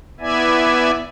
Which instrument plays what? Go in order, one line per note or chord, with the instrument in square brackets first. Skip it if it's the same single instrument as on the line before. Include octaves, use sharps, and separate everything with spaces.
[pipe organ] B3 E4 D5 E5 G#5